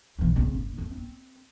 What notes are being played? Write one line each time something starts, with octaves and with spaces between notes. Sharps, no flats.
B1 E3
C#3 C4
F#1
F2 C4
C4